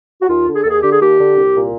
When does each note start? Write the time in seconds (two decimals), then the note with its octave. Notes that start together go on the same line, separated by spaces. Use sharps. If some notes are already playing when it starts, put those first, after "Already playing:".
0.22 F#4
0.28 D#2 F4
0.47 D3
0.55 G#4
0.64 D#2 A4
0.70 G#4
0.82 D3 G4
0.92 G#4
1.00 D#2 G4
1.18 D3
1.37 C2
1.55 A#2